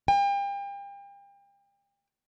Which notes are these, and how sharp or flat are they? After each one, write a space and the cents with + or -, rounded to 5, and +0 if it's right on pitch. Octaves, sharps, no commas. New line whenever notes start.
G5 +35